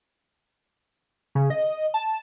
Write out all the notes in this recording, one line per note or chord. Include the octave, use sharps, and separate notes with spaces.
C#3
D#5
A5